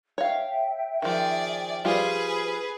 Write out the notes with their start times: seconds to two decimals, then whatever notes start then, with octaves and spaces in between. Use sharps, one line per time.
0.18 C#5 E5 F5 G5
1.02 D#3 F3 G#4 D5
1.85 F3 G3 F4 G#4 B4